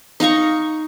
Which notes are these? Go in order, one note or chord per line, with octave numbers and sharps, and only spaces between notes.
D#4 F5 A#5 C#6